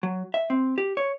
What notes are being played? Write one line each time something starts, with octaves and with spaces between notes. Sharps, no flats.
F#3
E5
C4
G4
C#5